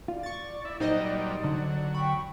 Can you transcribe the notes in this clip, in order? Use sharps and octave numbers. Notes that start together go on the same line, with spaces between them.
F4 D5
C#6 A6
E4
A#2 F#3 G3 D#4 C5 D#5
D3 F#3
G5 B5 C#6